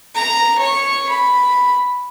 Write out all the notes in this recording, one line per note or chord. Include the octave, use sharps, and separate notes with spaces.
A#5
C#5 C#6
B5